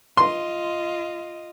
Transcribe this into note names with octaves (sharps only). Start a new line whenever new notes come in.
F4 D#5 C6